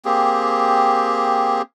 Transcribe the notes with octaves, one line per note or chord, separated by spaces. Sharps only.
A#3 C4 G4 G#4